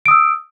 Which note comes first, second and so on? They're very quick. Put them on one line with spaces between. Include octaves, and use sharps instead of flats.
D7 D#6 E6